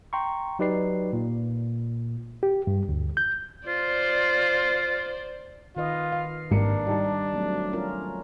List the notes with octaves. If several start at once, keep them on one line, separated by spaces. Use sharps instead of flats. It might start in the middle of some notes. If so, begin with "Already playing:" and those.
G5 A#5 C6 C#6
F#3 D#4 G4 B4 D5 C7
A#2
G4
G2
D2
G6
F4 C5 D5
D#3 F4 B4 D#5
F5
G#1 A#3 D4 G4 C#7
G3 D#4 D5 A5
F#3 A3 C4
C#4 F4 A#4